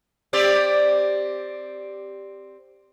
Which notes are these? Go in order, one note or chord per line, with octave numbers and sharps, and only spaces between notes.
C4 G4 D5